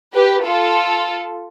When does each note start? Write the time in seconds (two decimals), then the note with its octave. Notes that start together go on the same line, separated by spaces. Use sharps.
0.14 G4 B4
0.46 F4 A4